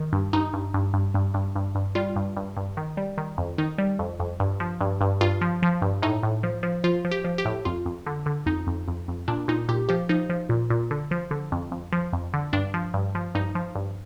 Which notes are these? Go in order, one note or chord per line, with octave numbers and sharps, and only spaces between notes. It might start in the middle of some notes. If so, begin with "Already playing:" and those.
Already playing: D#3
G2
G2 D#4
G2
G2
G2
G2
G2
G2
G2
G3 F4
G2
G2
G2
D#3
G3
D#3
F2
D#3 D#4
G3
F2
F2
G2
F3
G2
G2
G2 F4
F3
F3
G2
A2 D#4
A2
F3
F3
F3 F4
F3
G4
F3
G4
A2
F2 F4
F2
D3
D3
F2 D#4
F2
F2
F2
A#2 D4
A#2 D#4
A#2 G4
F3 G4
F3 D#4
F3
A#2
A#2
D3
F3
D3
F2
F2
F3
F2
D3
G2 D4
F3
G2
F3
G2 D#4
F3
G2